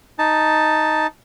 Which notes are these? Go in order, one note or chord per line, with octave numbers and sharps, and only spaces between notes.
D#4 A5